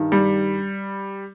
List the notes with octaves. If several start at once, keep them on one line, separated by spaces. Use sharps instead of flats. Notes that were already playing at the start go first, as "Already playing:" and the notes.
Already playing: G2 D#3
G3